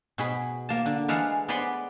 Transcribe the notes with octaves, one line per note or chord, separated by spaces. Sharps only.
B2 G#4 B5
A#3 A5
D3
E3 G#3 A4 F5 F#5
B3 D5 F#5 G#5 B5 C6